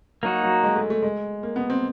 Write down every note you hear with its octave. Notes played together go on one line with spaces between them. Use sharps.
F#3 A#3 D#4 F#4
F#3
G#3
A3
A3
G#3
A#3
B3
C4